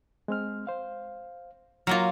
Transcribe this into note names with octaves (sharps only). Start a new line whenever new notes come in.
G#3 C4 F6
C5 F5
F#3 A#3 F4 F6